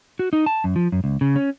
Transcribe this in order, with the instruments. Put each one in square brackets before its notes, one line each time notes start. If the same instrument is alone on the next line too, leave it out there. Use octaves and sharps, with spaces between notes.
[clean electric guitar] F#4
D#4
A5
F#2
F3
F#2
C#2
C#3
C#4